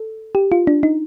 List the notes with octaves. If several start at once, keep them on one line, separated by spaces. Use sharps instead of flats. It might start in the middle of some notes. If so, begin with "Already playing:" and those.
Already playing: A4
G4
F4
D4
D#4